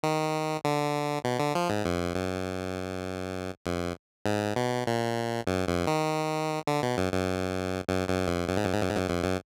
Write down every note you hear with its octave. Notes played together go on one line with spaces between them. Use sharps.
D#3
D3
B2
D3
F3
G#2
F2
F#2
F2
G#2
B2
A#2
F#2
F2
D#3
D3
B2
F#2
F#2
F#2
F#2
F2
F#2
G#2
F#2
G#2
F#2
G#2
F#2
F2
F#2